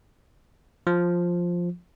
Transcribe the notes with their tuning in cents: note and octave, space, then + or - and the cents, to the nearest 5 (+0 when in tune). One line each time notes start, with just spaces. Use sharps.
F3 +5